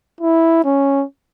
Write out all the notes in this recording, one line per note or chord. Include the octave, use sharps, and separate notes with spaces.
E4
C#4